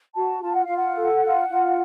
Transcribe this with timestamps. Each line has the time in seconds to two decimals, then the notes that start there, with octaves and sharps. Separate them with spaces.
0.15 F#4 A5
0.42 F4 A5
0.54 F#5
0.65 F4 F5
0.77 F#5
0.94 A4
1.22 F4
1.48 F4